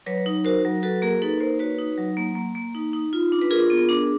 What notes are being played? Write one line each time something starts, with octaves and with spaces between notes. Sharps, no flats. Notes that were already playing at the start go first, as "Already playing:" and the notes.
F#3 B4 C#5
D#4
F#4 A#4 C5
F#3
F#4 A4 B4
A#3 G#4 A#4
D#4 A4 B4
A#3 A#4 C5
F#4 B4 C#5
D#4
F#3
A#3
A#3
A#3
D#4
D#4
F4
D4
B4
F4 G#4 A#4
B3
D4